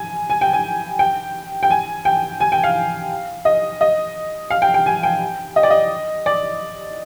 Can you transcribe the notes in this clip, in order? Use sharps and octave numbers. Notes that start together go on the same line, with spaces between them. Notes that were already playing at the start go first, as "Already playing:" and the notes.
Already playing: G#5
G#5
G5
G#5
G5
G5
G#5
G5
G#5
G5
F5
D#5
D#5
F5
G5
G5
G#5
G5
D#5
D5
D#5
D5